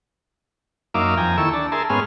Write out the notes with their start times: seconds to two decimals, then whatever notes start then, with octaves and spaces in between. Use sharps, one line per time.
0.94 F#2 A#3 D#4 E5 F5 D6
1.17 F2 G5 G#5 A#5
1.37 D#2 E4 A4 C#6 E6
1.53 D4 A5
1.72 G#4 A#4 E5 A5 C6
1.90 G#2 B3 C#4 G#4 C6 F6